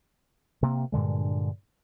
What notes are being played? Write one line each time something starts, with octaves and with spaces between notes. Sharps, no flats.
C3 A#3
G2 A#2 D3 G#3